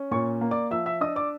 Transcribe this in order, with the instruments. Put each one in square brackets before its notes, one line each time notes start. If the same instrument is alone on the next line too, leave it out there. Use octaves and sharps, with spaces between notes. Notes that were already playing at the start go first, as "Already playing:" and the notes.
Already playing: [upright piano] C#4
A#2 C#5 C#6
A#3
D5 D6
F3 E5 E6
E5 E6
D4 D#5 D#6
D5 D6